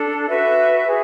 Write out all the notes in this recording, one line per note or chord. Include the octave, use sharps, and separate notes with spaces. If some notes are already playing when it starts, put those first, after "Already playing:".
Already playing: D4 A4
F#4 B4 E5
G#4